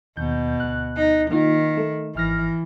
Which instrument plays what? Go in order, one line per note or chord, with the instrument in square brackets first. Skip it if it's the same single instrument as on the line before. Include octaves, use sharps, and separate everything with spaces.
[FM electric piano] D#2 G6 [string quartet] B2
[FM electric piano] D2 F#6
[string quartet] D#4
[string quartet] D#3 [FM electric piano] A#3 D#4 F4
[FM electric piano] A3
[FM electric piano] G#1 F6 A#6 [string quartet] E3